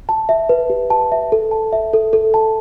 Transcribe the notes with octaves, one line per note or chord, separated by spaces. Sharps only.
A5
E5
B4
G4
A5
E5
A4
A5
E5
A4
A4
A5